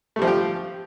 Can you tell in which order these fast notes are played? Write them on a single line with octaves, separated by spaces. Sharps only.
A3 G3 F3 F4 G4